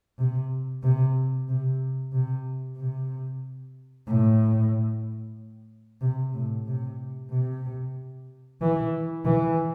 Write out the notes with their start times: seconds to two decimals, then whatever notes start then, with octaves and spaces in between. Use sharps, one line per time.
0.18 C3
0.82 C3
1.48 C3
2.12 C3
2.77 C3
4.07 A2
6.01 C3
6.33 A2
6.66 C3
7.30 C3
8.61 E3
9.25 E3